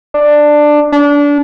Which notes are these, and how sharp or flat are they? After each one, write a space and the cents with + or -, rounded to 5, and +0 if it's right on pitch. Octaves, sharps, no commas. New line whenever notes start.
D4 +10
D4 -25